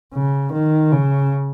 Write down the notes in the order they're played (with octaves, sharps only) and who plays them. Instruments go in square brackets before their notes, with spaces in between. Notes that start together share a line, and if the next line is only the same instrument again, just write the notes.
[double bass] C#3
D#3
C#3